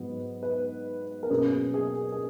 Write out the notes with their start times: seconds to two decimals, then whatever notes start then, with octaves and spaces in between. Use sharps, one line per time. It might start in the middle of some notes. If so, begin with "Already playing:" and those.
Already playing: G#2 F#3 B3
0.43 B4
1.23 A#4
1.30 B2 F#3 A#3 C#4 G#4
1.74 G#4
2.12 G#4